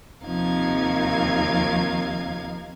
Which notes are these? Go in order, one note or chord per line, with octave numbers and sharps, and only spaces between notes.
D#2 C3 F3 D#4 F5 G#6